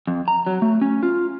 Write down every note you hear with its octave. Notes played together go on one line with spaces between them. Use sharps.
F2
A#5
F#3
A3
C#4
F4